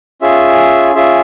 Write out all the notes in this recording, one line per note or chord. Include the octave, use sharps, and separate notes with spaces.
C#4 F4 G#4 E5
C#4 F4 G#4 E5